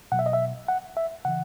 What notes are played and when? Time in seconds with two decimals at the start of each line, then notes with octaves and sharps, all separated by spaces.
0.12 B2 F#3 F#5
0.19 E5
0.26 D#5
0.33 E5
0.68 F#5
0.97 E5
1.25 C#3 E3 F#5